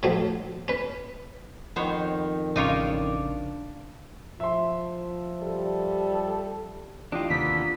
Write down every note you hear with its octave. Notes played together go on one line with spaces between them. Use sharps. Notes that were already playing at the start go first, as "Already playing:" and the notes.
A2 D#3 F3 F#3 A3
C#4 B4
F2 D#3 B3 C5 C#5
A1 C#3 D4 D#4 F4 C#5 F5 D6
F3 E5 C6
G3 A4
E3 D4 F4 G4 D#5
D#2 C3 E3 A#3 B3 A4 B6